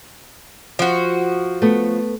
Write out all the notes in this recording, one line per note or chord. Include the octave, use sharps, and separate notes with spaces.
F3 F#4
A3 B3